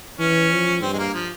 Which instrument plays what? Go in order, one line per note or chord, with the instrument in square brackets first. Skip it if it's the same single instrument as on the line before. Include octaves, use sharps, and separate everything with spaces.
[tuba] E3 [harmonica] C#4
[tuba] F3
[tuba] G2 [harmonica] C4
[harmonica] G#3
A#3
F3